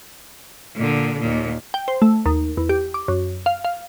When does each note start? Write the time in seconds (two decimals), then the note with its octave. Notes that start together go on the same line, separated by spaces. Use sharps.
0.76 A#2 D3
1.21 D#2 A#2
1.74 G5
1.88 C5
2.02 A3
2.26 D#2
2.57 E2
2.69 G4
2.94 D6
3.08 F#2
3.46 F5
3.65 F5